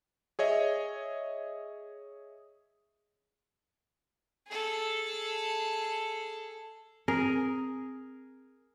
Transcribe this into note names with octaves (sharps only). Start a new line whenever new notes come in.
G#4 C#5 D#5 E5
G#4 A4
C4 G#4 A#4